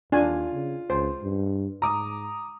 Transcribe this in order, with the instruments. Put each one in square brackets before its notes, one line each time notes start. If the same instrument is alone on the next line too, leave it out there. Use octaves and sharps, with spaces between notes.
[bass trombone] D#2 [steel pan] D4 G#5 [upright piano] F4
[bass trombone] C#3
[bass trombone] C#2 [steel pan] C5
[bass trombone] G2
[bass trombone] G#2 [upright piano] A#5 D6 D#6